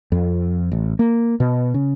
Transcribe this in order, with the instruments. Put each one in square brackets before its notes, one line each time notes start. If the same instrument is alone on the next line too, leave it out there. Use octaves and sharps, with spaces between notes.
[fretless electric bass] F2
A1
A#3
B2
C#3